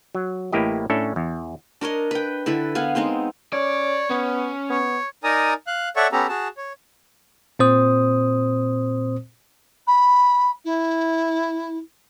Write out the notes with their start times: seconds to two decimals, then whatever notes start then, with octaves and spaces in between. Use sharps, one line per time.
0.15 F#3
0.52 A1 A2 A#3 E4 G4 D#5
0.90 A2 C#4 D4 A4 E5
1.16 E2
1.81 D4 A#4 C#5 D#5
2.11 B4 G5
2.46 D3 E4 A4 B4
2.75 B3 F5 F#5 G#5
2.95 G#3 B3 C4 D#4
3.53 C#4 C#5 D5
4.10 B3 C#4
4.70 B3 C#5
5.24 D#4 A#4 D5 G#5 A#5 D#6
5.67 F5 F#6
5.96 A4 C#5 D5 E5 F#5 C#6
6.12 B3 C#4 G4 A4 A#5
6.29 F#4 G#4 A5
6.57 C#5
7.59 A#2 C4 C5 D#6
9.87 B5
10.65 E4